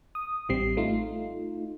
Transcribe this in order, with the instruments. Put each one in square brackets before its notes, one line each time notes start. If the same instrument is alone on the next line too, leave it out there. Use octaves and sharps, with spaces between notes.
[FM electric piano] D#6
A1 G3 C4 C7
A3 D#4 F4